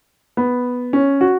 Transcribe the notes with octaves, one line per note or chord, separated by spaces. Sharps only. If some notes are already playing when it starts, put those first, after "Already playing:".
B3
C#4
F#4